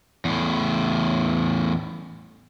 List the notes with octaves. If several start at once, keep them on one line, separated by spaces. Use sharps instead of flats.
E2 A2